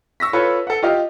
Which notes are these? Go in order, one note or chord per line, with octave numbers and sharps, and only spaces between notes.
C#6 E6 A#6 B6
F4 A4 B4 C#5
A4 F#5
F4 G4 D#5 F5